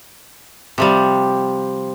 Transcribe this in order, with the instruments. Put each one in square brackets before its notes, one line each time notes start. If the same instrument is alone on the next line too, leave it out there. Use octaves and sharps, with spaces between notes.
[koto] C3 F3 G3